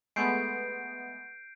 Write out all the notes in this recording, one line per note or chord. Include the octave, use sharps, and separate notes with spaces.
G#3 A3 B3 G6 C7 D7